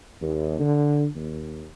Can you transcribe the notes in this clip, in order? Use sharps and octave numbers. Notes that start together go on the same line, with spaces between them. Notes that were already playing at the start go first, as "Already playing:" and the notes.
D#2
D3
D#2